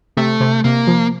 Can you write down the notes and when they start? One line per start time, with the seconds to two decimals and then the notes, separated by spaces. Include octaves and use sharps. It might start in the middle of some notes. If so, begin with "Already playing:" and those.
0.17 C3 A3
0.40 C3
0.64 C3 A#3
0.87 F3